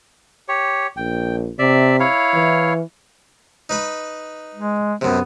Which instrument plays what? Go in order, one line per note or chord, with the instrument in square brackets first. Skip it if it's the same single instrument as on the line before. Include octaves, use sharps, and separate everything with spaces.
[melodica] G4 C#5
[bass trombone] A#1 [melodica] G5
[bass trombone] C3 [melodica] D5 E5
[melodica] E4 C#5 F5
[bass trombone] E3
[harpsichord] D#4 B4 B5
[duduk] G#3
[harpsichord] F#2 C3 [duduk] B3